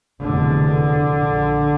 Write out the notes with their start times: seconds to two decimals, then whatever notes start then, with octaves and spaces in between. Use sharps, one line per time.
0.21 F1 E2 B2 D3
1.09 A#1 A#2